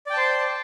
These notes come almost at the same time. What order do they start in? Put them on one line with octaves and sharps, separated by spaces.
D5 G5 A5 C5